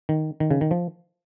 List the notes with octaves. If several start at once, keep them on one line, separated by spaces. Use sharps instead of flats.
D#3
D#3
C#3
D#3
F3